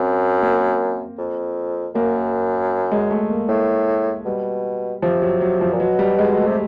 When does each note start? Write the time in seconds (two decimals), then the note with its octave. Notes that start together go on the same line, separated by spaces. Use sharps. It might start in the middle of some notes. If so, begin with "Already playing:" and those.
Already playing: F#2 C4
0.42 A#3
1.18 F2
1.95 F#2 A#3
2.91 G#3
3.11 A3
3.30 A#3
3.48 A2 A#3
4.25 B2 G3
5.02 C3 F3
5.22 F#3
5.41 F#3
5.61 F3
5.72 A#2
5.80 B2 F#3
5.99 G3
6.19 G#3
6.37 A3
6.46 C3